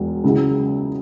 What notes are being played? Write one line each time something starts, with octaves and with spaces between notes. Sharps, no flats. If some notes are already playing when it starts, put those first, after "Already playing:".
Already playing: E1 E2 F#3
C#2 C#3 F#3 E4 G#4